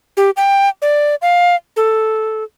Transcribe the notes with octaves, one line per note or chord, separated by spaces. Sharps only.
G4
G5
D5
F5
A4